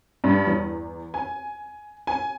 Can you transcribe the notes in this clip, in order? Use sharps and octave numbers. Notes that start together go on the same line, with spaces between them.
G2
E2
G#5
G#5